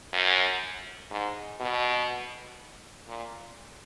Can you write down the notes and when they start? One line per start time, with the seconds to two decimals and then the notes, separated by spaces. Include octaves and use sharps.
0.13 F#2
1.11 G#2
1.60 B2
3.08 A#2